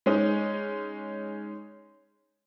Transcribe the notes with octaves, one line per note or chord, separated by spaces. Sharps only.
G#3 C#4 D#4